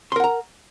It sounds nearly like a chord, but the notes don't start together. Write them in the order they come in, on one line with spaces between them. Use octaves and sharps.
C6 A#4 F#5 A#5